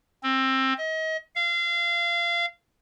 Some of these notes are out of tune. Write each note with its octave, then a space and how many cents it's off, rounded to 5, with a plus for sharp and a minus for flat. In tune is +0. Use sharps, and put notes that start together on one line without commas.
C4 +20
D#5 +35
F5 -25